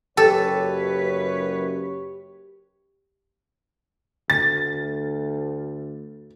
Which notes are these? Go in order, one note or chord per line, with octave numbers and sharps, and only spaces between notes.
F#1 F#2 G4 A4 B4 C#5
D2 A6